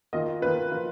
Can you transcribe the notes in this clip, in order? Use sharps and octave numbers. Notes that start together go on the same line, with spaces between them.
D#3 A#3 F4 D#5
D#3 A#3 F4 B4
F3 A#3 F4